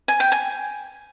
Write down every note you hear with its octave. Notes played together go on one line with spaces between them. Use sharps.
G#5
G5
G#5